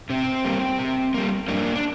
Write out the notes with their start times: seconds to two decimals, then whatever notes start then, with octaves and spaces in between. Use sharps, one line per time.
0.10 C3 C4
0.45 G3 A#3
0.79 C3
1.14 G3 A#3
1.48 G2 A#3 D4
1.75 D4